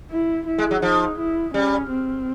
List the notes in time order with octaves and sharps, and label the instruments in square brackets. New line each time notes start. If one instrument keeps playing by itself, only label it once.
[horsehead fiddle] E4
E4
[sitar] G#3
F#3
[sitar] F3 [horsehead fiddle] D#4
[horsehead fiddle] E4
[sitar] G3 [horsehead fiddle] C#4
[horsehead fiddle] C4